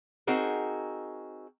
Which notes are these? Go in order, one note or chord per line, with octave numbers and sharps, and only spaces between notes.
C4 D#4 F#4 G#4 A#4